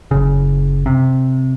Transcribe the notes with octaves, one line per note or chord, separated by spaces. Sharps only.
F#1 C#3
C3